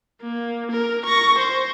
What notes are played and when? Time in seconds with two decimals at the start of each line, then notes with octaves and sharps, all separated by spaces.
0.21 A#3
0.71 A#4
1.05 C#6 A#6
1.38 C5